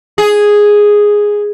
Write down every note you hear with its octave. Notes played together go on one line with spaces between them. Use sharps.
G#4